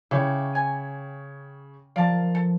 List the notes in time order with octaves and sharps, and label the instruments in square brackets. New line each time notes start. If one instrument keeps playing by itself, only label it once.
[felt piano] C#3 C#5 [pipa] E4 [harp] G5 C#6 D6
[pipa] G#5
[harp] F3 A#4 [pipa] D5 A5 [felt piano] F5
[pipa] A4